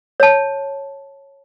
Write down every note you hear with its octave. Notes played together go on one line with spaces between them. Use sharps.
C#5 A5